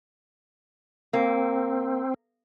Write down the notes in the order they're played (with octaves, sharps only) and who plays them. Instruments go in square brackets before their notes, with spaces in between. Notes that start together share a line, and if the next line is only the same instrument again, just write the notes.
[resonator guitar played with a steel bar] A#3 [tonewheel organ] C4